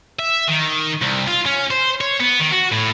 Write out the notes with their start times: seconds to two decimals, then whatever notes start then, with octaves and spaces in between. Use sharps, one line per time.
0.19 E5
0.48 D#3
1.02 C2
1.28 F4
1.46 C#4
1.70 C5
2.01 C#5
2.20 B3
2.39 D#3
2.51 F#4
2.72 A2